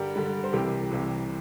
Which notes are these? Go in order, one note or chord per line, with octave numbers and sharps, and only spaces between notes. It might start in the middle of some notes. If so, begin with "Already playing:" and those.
Already playing: G2 D3 G3 G4 A#4
G2 D3 G3
C5
C2 C3 E3 G4 A#4
C2 C3 E3